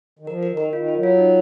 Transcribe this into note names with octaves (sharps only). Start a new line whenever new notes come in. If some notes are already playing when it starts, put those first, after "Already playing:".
D#3
F3 A#4
A#4
D#3
A#4
D#3 F4
F4
F#3
F4
D#4